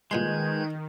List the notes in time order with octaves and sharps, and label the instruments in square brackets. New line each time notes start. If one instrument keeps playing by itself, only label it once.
[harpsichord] A#2 G3 C6 [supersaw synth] D#3 [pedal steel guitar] G#3 [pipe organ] B4 G6 G#6